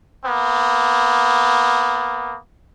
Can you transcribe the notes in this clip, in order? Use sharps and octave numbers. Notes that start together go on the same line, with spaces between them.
A#3 B3